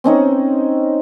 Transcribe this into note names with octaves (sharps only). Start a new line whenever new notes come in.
C4 C#4 D#4 C#5